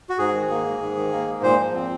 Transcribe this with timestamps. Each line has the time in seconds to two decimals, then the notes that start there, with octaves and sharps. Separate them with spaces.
0.10 F#4
0.18 G#2 G#4
0.34 D#3
0.50 A#3
0.65 G#2
0.81 G#2
0.96 D#3
1.12 A#3
1.27 G#2
1.43 A#2 C5
1.58 F3
1.74 C4